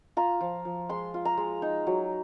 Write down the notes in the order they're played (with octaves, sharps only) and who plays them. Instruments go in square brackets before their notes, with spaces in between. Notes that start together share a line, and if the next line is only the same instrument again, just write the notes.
[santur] F4 A#5
F3
F3
G#3 C6
F4
A#5
G#3
D#4
F#3